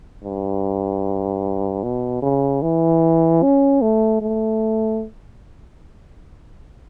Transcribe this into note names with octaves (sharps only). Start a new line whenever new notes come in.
G2
B2
C#3
E3
C#4
A3
A3